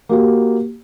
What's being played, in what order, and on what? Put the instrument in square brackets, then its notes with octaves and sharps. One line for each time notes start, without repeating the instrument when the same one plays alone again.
[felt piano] A#3 F#4 G4